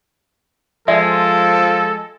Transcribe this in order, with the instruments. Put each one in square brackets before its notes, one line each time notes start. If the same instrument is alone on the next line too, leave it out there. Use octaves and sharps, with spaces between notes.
[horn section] F3 [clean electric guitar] G#3 [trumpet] A4 [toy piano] D5 E5